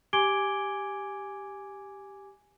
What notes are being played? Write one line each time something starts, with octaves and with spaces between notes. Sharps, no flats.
G4 G#5 D6 G#6 D7 G7